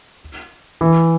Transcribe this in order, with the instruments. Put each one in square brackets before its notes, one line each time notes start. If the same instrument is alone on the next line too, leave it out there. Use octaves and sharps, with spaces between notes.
[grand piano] E3